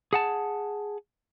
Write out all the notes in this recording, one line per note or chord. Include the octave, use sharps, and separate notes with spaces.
G#4 F#5 A5